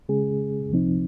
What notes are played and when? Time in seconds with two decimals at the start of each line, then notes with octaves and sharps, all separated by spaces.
0.09 C#3 G#3 C#4 G#4
0.70 C2 C3 F3 C4 D#4